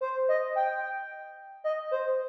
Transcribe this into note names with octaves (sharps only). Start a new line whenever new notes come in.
C5
D#5
G5
D#5
C5